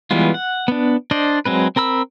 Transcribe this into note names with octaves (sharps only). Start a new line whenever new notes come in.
E3 G3 G#3 B3 F4
F#5
B3 D4
D4 C5 D5 D#5
F#3 G#3 C4 B4
C4 A#4 B5 E6